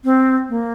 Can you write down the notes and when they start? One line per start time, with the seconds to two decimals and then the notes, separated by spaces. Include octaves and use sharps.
0.04 C4
0.49 A#3